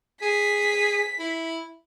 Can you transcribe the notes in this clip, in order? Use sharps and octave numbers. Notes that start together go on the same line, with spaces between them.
G#4 B6
E4